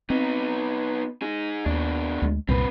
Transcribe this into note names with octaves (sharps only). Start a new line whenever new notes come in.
B3 C4 D#4
D#4 G#4
D#2 B2 D4
D2 G#3
C2 F#2 A#2 C4 B4